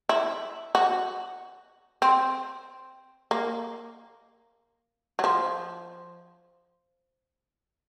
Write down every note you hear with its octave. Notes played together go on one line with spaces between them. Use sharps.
E4
F#4
C4
A#3
F#3
F3